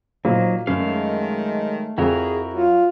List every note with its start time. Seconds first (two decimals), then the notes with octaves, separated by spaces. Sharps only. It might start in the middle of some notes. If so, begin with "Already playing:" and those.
0.25 A#2 F3 F#3 D#4 C5
0.67 F#2 D#3 F#3 G#3 A3 F5
1.98 F2 E4 F#4 G#4 A#4
2.54 F#3 F4